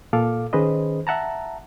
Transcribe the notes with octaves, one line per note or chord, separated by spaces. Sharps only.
A#2 A4 F5 D6
D#3 C#4 G#4 B4 C5 D#5
E5 F#5 A5 A#5